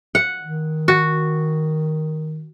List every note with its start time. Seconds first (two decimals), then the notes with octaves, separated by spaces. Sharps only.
0.15 F#5
0.41 D#3
0.88 F#4